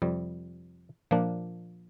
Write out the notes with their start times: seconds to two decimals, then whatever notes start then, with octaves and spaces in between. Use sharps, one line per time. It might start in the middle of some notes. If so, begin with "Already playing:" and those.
0.02 F2 C3 G3
1.11 A#2 F3 A#3 D4